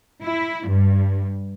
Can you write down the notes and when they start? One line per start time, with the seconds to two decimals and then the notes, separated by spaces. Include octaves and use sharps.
0.23 E4
0.68 G2